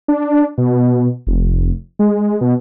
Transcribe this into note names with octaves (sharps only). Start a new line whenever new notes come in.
D4
B2
F1
G#3
B2